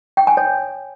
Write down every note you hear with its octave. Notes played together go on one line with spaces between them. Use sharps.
G5
G#5
C#5